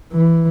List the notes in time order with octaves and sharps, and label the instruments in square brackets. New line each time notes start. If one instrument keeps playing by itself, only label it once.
[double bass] E3